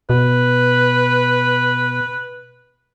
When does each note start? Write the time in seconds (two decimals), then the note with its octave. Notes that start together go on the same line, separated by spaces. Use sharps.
0.10 B2 B4